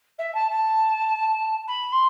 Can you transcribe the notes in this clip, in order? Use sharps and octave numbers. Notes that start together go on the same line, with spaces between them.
E5
A5
A5
B5
C6